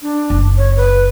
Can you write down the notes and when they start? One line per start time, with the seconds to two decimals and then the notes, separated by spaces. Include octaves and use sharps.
0.02 D4
0.30 F#1
0.57 C#5
0.76 B4